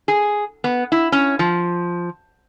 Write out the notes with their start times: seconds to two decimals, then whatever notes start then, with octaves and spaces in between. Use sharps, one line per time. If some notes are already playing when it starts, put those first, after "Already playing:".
0.08 G#4
0.64 B3
0.92 E4
1.12 C#4
1.39 F3